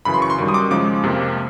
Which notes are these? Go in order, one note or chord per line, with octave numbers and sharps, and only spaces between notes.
F#2 C#3 E3 B5
C6
C#6
C6
F#2 D#3 G3
D#6
D6
C#3 F3 G#3 D6
F2 C3 F3 A#3